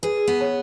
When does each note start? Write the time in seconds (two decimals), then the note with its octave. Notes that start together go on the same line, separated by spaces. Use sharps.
0.03 G#4 B4
0.28 B3
0.41 C#5